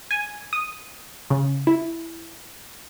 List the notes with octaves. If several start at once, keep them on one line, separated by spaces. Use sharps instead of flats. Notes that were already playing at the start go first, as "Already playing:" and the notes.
G#5
D#6
C#3
E4